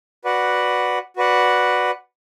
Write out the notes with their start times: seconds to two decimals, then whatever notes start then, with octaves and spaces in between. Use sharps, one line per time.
0.24 F#4 B4 D5 F#5
1.16 F#4 B4 D5 F#5